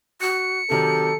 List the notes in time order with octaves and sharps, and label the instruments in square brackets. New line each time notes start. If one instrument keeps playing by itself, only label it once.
[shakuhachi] F#4 [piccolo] C#7
[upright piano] C3 D#3 F#3 [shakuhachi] G4 [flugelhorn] A4